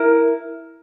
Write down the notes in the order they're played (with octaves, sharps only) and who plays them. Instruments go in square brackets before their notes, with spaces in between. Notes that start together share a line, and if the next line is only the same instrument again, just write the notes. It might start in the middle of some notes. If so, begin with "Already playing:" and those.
Already playing: [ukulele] E4 A#4